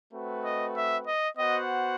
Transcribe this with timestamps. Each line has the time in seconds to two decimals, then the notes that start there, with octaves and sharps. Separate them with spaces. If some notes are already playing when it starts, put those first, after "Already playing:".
0.14 A3 C4 F#4 B4
0.44 D#5
0.76 E5
1.07 D#5
1.38 B3 F#4 C5 D#5 F#5